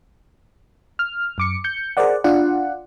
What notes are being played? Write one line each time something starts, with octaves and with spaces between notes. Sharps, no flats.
F6
F#2 D6 C#7
G6 C#7
G#4 A#4 C5 D5 F#5
D4 F4 D5 F#5